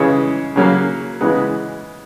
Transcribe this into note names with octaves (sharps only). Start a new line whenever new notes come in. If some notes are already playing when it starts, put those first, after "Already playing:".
Already playing: C#3 E3 G#3 C#4
C#3 F#3 A#3
C#3 E3 G#3 B3